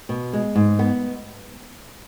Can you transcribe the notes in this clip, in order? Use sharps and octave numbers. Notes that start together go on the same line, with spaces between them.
B2
G#3
G#2
B3